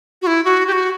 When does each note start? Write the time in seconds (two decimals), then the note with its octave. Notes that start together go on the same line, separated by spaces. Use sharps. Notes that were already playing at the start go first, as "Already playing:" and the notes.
0.22 F#4
0.27 E4
0.44 F#4
0.68 G4
0.72 F#4